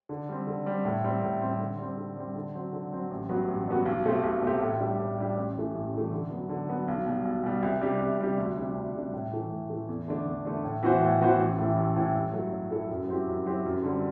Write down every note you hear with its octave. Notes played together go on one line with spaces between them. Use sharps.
D3
G3 C4
D3
G3 C4
A2
G3 C4
A2
G3 C4
D3
G3 C4
D3
G3 C4
D3
F#3 C4
D3
F#3 C4
A1
G2 F#3 B3 F#4
A1
G2 F#3 B3 F#4
B1
B2 A3 C4 G4
B1
B2 A3 C4 G4
A2
G3 D4 G4
A2
G3 D4 G4
A1
G2 E3 A3
A1
G2 E3 A3
D3
F#3 B3
D3
F#3 B3
B1
B2 G3
B1
B2 G3
C2
C3 G3 D4 G4
C2
C3 G3 D4 G4
D2
C3 G3 D4
D2
C3 G3 D4
A2
E3 A3
A2
E3 A3
E2
D3 A3 D4
E2
D3 A3 D4
A2
E3 B3 F#4 C5
A2
E3 B3 F#4 C5
A1
A2 E3
A1
A2 E3
G2
F#3 A3 E4 A4
G2
F#3 A3 E4 A4
F#2
F#3 C4 E4 G4
F#2
F#3 C4 E4 G4
F#2
D3 G3 C4